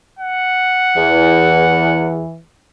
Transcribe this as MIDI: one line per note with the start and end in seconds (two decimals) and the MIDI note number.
0.19 2.13 78
0.96 2.19 40
0.96 2.38 52